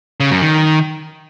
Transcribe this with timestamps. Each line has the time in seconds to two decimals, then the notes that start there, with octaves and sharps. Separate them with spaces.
0.20 C#3
0.31 F#2
0.42 D#3